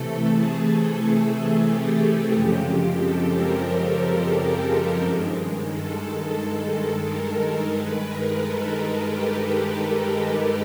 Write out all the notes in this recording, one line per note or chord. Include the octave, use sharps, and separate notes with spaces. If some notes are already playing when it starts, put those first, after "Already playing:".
Already playing: C3 E3 A3 A4
G#4
G4
F#2 C#3 F3 G#3 C4
A4
A#4
A4
G2 D#3 G#3
A4
A#4
G2 D#3 G#3 B4
A#4
A4
G4